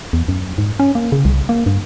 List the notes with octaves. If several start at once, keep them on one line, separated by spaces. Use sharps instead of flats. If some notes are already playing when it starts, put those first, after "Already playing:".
E2
F#2
G#2
C#4
A#3
C#3
C2
A#3
G2